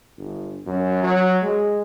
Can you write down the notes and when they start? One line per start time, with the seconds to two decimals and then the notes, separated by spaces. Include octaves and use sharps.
0.18 G1
0.67 F#2
1.04 F#3
1.43 G#3